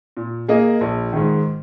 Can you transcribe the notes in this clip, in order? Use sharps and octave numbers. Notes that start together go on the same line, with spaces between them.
A#2
A#3 G#4 D#5
A#1
G#2 D#3